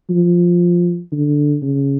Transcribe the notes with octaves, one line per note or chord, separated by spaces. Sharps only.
F3
D3
C#3